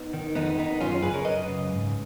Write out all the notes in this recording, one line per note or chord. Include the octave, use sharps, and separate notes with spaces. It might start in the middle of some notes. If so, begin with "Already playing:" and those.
Already playing: B3 D#4
D#3
F2 B3 D#4
D#3 B3 D#4
F#2 C#4 F4
F4 G#4
C#3 G#4 B4
A#4 C#5
F#2 B4 D#5
C#3
G#2